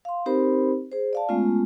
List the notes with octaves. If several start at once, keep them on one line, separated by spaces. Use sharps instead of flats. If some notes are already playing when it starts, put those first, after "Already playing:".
F5 C6
C4 D#4 G4 A#4 C5 B5
G#4 C5
D5 F5 A5
G#3 A3 B3 C#4 F4